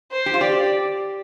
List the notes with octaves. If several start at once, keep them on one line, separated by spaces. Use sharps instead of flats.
C5
G4
F4
G4 D5